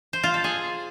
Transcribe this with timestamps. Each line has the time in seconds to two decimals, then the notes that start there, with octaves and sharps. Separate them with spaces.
0.13 C5
0.24 F4
0.34 A4
0.44 G#4